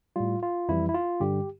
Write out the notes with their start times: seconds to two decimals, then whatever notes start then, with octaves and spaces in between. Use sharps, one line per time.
0.16 A2 G3 F4
0.43 F4
0.69 F2 E3 G3 E4
0.89 E4
0.94 F4
1.20 G2 D3 G3 G4